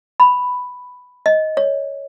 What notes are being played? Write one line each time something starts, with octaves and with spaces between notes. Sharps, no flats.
B5
D#5
C#5